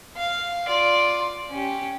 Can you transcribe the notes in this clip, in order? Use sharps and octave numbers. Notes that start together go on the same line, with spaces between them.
F5
F4 D5
C#4 G4